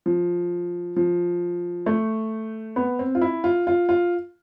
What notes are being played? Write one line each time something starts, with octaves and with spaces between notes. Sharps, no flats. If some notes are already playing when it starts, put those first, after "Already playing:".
F3
F3
A3
B3
C4
F4
E4
F4
F4
F4